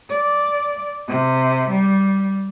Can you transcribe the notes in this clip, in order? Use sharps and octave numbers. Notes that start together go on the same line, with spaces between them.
D5
C3
G3